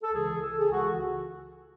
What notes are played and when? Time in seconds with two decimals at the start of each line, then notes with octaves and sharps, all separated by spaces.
0.03 A4
0.11 C#2 C#3 E3 G#4
0.41 A4
0.60 G#4
0.71 C#2 C#3 E3 F#4